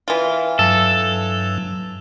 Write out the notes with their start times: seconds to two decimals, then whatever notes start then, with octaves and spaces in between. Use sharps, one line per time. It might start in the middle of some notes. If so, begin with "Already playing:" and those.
0.08 E3 F4
0.59 G2 F#3 A4